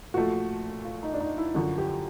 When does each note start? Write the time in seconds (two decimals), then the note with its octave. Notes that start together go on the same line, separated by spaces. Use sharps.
0.14 A#2 F3 A3 F#4
0.85 F4
1.03 D#4
1.13 D4
1.21 D#4
1.38 E4
1.55 F#2 D3 F3 F#4
1.78 G4